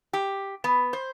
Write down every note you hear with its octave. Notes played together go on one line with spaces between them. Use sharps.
G4
B3
C5